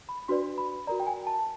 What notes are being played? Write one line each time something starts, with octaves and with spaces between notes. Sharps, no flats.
B5
D4 F#4 B4 D5 C6
B5
F#4 A#4 D5 A#5
G5
G#5
A5